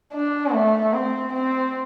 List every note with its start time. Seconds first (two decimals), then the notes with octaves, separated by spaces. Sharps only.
0.14 D4
0.53 A3
0.93 C4
1.33 C4